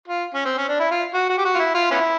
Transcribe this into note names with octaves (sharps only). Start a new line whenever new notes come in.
F4
C#4
C4
C#4
D4
E4
F4
F#4
F#4
G4
F#4
F4
E4
F4
B3 C#4 E4